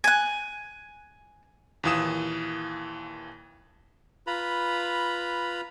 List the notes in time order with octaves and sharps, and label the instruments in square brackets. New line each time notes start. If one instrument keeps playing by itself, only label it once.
[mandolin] G#5 F#6
[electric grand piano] D#2 A#2 E3 F5 D#6 E7
[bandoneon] F4 B4 A#5 B5